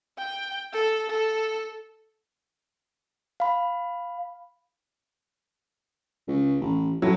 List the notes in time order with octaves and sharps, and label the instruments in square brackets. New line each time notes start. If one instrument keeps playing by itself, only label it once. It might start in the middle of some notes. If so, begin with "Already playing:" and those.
[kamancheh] G5
A4
A4
[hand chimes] F5 B5
[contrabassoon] C#2
A1
[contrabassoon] A2 [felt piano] F#3